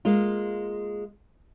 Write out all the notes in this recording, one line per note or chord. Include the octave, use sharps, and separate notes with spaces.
G#3 A#3 F4